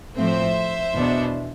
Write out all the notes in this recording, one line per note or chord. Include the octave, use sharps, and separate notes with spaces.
A2 F3 A3 C4 C5 E5
E2 B2 B3 D4